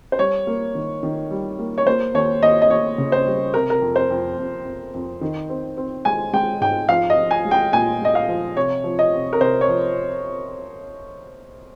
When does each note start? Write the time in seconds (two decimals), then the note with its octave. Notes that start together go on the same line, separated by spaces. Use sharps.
0.12 C5
0.19 G3 C#5
0.47 A#3
0.75 D#3
1.03 D#3
1.31 G3
1.59 A#3
1.78 C#5
1.86 A#3 C5
2.14 D#2 C#5
2.43 D#2 D#5
2.62 D#5
2.70 D#2 C#5
2.98 C#3
3.12 C5
3.26 G3
3.54 C3 A#4
3.70 A#4
3.82 F2
3.96 C5
4.11 F2
4.38 F2
4.65 F2
4.94 F2
5.21 D#3
5.49 C4
5.77 C4
6.05 G#3 G#5
6.33 G#3 G5
6.61 G#2 G5
6.89 F3 F5
7.10 D#5
7.17 F3
7.31 G#5
7.45 G#3
7.51 G5
7.73 A#2 G#5
8.01 G#3 D#5
8.15 F5
8.29 F3
8.57 C3 C#5
8.84 F3
8.99 D#5
9.13 C3
9.33 A#4
9.41 C2 C5
9.61 C#5
9.68 F3